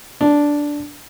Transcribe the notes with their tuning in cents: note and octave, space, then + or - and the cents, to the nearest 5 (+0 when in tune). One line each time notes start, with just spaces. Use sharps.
D4 -5